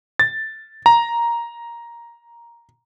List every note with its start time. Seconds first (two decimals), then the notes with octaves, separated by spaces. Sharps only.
0.20 A6
0.86 A#5